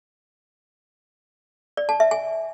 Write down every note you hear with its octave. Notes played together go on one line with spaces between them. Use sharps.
D5
A5
E5
G#5